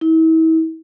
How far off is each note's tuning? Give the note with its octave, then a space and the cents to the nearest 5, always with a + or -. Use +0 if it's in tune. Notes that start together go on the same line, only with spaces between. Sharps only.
E4 -40